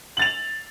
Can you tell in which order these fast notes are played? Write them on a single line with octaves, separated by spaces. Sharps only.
F#7 A6 F7